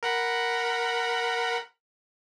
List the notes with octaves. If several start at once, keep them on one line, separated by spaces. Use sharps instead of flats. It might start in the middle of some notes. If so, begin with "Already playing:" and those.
A#4 F#5 B5